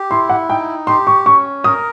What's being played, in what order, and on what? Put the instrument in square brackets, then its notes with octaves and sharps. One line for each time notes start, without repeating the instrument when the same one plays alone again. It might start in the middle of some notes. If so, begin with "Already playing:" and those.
Already playing: [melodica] G4
[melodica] E4 [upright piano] C6
[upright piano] F#5
[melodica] D#4 [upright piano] G5
[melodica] G4 [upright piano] C6
[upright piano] C#6
[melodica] C#4 [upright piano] C#6
[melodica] A#4 [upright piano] D#6